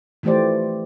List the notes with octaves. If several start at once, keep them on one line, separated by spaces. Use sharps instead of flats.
E3 F3 A3 G4 C5 D5